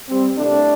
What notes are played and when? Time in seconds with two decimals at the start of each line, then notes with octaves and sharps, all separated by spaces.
0.09 G3 C4
0.37 C2 C3 G3 A3 D4